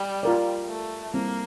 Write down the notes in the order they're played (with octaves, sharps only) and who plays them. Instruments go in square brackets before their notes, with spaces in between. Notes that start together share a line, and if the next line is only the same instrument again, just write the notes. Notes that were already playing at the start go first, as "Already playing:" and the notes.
Already playing: [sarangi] G3
[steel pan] F4 A#4 D5
[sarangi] A3
[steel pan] G3 C4 E4 [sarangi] A#3